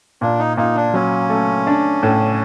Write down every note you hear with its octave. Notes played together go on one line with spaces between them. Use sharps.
A#2 D4
D#4
A#2 D#4
D4
F#3 C#4
A3
D4
A2